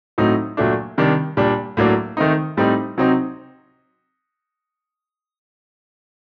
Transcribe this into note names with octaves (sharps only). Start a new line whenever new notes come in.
A2 F#3 C4 D#4
A#2 F#3 A3 D4
C3 D#3 G3 D4
A#2 G3 D4
A2 F#3 A#3 D4
D#3 A3 C4 D#4
A2 G3 C4 D#4
C3 F#3 C4 D#4